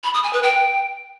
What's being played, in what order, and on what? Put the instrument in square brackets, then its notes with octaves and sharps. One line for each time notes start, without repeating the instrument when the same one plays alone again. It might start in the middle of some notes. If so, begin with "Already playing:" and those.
[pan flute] B5
D#6
G#5
B4
G5